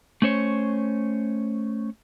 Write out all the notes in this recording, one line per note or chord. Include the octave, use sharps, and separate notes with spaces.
A3 C#4 C5 C#5